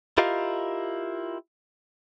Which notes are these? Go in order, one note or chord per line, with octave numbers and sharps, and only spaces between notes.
E4 F4 G4 A#4 D#5 F5